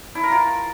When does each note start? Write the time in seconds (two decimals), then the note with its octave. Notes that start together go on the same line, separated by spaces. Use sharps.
0.15 E4
0.23 A#4
0.32 F4